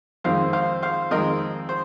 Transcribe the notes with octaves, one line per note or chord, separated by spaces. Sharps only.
F2 D#3 G#3 C4 C5 F5
C5 F5
C5 F5
F2 D#3 G#3 C4 A#4 D#5
C5